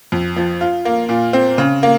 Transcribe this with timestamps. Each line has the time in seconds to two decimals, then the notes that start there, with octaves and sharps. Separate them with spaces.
0.12 F2
0.36 F3
0.61 F4
0.85 A#3
1.09 A#2
1.33 C4
1.58 C#3
1.83 A#3